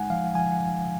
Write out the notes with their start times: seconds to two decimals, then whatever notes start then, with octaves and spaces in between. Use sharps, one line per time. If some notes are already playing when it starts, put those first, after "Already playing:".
Already playing: G#3 D#4 F#5 G#5
0.10 F3 F5
0.35 F3 G#5